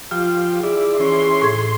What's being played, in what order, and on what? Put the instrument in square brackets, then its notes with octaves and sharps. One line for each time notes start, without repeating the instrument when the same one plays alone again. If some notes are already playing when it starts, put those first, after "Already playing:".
[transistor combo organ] F3 G4 [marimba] F4
[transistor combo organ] E4 D5 [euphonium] G#4
[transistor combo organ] E3 C#4 [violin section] C6
[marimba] A2 G#6